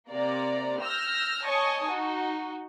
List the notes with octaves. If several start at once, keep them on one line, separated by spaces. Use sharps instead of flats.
C3 A#3 D5 A#5
E6 F6 G6 A#6
C#5 D#5 G#5 A5 C#6 D#6
D#4 F#4